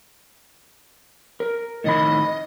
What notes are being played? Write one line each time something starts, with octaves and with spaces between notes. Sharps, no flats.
A#4
A2 D#3 D#5 B5